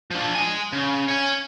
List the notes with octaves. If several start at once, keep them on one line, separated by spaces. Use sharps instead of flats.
F3 D4
D#5 G#5
C#3
C#5 G#5